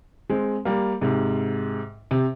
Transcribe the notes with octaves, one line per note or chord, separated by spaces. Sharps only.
G#3 C4
G3 A#3
G#2 C3
C3